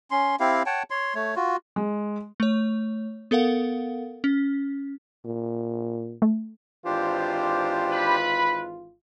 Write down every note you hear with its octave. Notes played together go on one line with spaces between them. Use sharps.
C#4 C6
C4 E4 G4 F5
C#5 F#5 G5 A5
C#5 C6
A3 C#5
F4 F#4
G#3
A3 C#5
B3 A4 A#4 F5 F#5
C#4
A#2
A3
G#1 E3 D4 F4 G4 C5
B4 B5